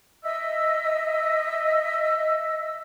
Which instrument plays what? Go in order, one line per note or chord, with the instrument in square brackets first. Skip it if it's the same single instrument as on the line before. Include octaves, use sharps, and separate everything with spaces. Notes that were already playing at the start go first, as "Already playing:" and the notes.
[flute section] D#5 E5 E6